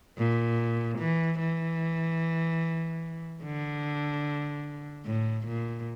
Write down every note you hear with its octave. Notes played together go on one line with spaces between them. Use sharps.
A#2
E3
E3
D3
A2
A#2